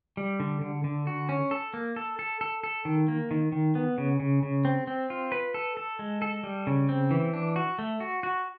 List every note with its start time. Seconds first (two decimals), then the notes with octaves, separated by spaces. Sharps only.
0.17 G3
0.40 D3
0.61 D3
0.84 D3
1.07 F#4
1.29 C#4
1.51 A4
1.74 A#3
1.96 A4
2.19 A4
2.41 A4
2.64 A4
2.85 D#3
3.08 A#3
3.31 D#3
3.52 D#3
3.75 B3
3.98 C#3
4.20 C#3
4.43 C#3
4.65 C4
4.87 C4
5.10 F4
5.32 B4
5.54 A4
5.77 A4
5.99 G#3
6.22 A4
6.44 G3
6.67 C#3
6.89 C4
7.11 E3
7.34 D4
7.56 F#4
7.79 A3
8.00 F#4
8.23 F#4